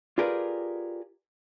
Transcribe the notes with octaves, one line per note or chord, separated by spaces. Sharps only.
F4 G4 G#4 A#4 B4 D5